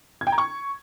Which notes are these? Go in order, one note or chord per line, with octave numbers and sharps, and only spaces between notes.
G#6
G5
A#5
C#6